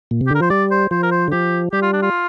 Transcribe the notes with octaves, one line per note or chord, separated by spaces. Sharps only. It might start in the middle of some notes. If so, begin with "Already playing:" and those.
A#2
C3
G4
D3 A#4
F3 C5
G3 D5
C5
F3 C5
A#4
C5
D3
F3 G4
G3 G4
F4
D4
F4